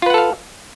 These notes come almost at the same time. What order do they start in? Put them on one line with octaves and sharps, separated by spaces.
F4 B4 F#5 A4 F5